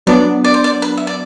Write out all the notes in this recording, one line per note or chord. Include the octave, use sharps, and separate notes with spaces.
F#3 B3 D4 D5
D5
C5
D5
B4
E5
D5